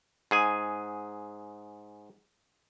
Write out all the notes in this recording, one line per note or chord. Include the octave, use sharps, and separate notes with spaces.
G#2 G#4 G#5